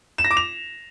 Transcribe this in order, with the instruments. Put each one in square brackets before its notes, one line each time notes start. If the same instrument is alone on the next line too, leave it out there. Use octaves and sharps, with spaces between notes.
[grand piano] E7
A#6
D6
F7